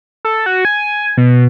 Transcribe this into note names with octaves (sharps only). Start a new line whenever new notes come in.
A4
F#4
G#5
B2